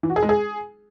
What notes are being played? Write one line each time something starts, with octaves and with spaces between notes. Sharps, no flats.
E3
F#4
G#4
G#3
G#4